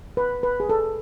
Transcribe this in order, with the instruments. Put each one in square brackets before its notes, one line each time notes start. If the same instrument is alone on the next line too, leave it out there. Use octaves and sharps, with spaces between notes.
[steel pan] B4
B4
G#4
A4